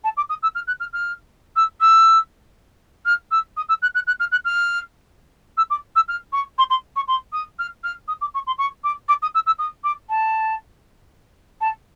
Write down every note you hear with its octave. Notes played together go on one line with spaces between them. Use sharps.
A5
D6
D#6
E6
F6
F#6
F6
F6
E6
E6
F6
E6
D#6
E6
F#6
F#6
F#6
F6
F#6
F6
E6
D6
E6
F6
C#6
C6
C6
C#6
C6
D#6
F6
F6
D#6
D6
C#6
C6
C#6
D6
D6
D#6
E6
E6
D#6
D6
A5
A5